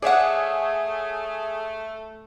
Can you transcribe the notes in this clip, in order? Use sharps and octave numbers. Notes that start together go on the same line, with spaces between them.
A3 G#4 C#5 D5 E5 F#5